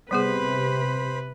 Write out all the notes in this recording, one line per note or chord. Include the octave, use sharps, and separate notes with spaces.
C3 G3 B3 G#4 B4 C5 B5